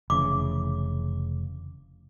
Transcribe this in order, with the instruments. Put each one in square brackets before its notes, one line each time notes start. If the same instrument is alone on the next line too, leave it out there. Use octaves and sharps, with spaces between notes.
[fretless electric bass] F1 C#3 E3 [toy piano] D6